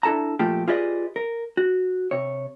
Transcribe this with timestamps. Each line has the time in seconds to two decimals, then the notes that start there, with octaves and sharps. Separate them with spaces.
0.03 D4 E4 A4 A5 A#5
0.39 A#2 F3 A3 F4 G4
0.68 F4 G4 G#4 B4 D5 D#5
1.16 A#4
1.57 F#4
2.11 C3 C#5